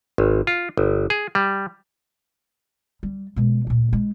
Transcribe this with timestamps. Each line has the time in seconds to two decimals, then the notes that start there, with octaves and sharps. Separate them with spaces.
0.18 G#1
0.47 F4
0.77 G1
1.10 G#4
1.35 G3
3.03 G3
3.36 B2 G#3
3.67 D2 A#2
3.93 G#3 E4